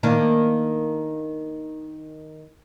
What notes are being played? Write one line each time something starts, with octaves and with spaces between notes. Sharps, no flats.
D#3 A#3 D4